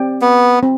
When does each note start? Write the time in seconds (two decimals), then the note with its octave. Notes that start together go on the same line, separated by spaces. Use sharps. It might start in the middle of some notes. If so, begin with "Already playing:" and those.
Already playing: C4 G4 D5 G5
0.22 B3
0.63 C4